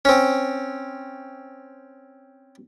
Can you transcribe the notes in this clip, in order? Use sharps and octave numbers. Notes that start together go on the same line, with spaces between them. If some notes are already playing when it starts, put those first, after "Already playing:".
C4 C#4